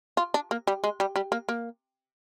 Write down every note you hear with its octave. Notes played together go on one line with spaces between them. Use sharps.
F4
D4
A#3
G3
G#3
G3
G3
A#3
A#3